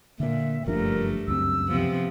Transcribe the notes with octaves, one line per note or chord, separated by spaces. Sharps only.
A#2 D3 A#3 E5
F#1 G2 F3 A3 D4 A#4
C#2 F#2 C4 E6
C3 F3 B3